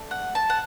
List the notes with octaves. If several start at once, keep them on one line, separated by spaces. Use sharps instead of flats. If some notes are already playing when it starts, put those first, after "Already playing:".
Already playing: A3 D4
F#5
A5
F#5